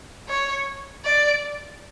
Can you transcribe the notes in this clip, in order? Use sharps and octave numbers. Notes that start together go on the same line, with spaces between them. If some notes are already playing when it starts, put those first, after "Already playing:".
C#5
D5